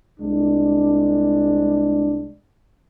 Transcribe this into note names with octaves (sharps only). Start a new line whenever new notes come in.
C2 G#3 D4